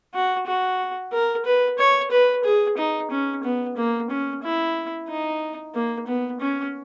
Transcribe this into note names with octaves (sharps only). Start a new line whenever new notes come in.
F#4
F#4
A#4
B4
C#5
B4
G#4
D#4
C#4
B3
A#3
C#4
E4
D#4
A#3
B3
C#4